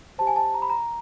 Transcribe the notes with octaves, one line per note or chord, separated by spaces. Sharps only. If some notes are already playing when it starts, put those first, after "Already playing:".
G4 C5 A5
G#5
A5
A#5
B5
A#5